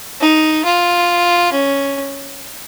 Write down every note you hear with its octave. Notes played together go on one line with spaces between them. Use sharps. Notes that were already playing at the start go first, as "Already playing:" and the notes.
D#4
F4
C#4